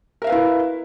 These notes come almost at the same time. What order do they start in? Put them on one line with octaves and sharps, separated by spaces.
A#4 E5 F5 B4 E4